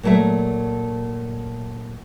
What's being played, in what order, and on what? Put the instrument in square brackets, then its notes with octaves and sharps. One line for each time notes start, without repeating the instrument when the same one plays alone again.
[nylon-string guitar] A#2 F#3 A3 A#4 E5